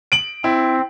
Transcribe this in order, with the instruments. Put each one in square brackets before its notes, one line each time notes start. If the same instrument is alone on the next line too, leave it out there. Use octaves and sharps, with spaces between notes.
[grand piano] D7 F#7
[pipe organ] C4 [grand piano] E4